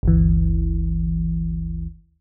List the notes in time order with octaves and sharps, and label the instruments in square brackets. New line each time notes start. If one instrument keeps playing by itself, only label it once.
[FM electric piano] G1 D2 E3